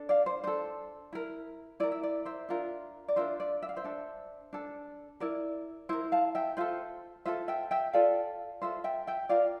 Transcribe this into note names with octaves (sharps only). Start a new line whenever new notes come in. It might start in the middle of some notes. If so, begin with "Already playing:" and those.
Already playing: D4 A4
D5 F5
C5
D4 A4 C5
E4 A#4
E4 A#4 D5
E5
D5
C5 E5
D4 F4 A#4
D5
D4 F4 A#4 C5 E5
D5
E5
F5
C5 E5
D4 A4
D4 A4
E4 A#4 D5
E4 A#4 C5
F5 A5
E5 G5
F4 A4 C5 E5
F4 A4 C5 E5
E5 G5
E5 G5
F4 A4 D5 F5
F4 A4 C5 E5
E5 G5
E5 G5
F4 A#4 D5 F5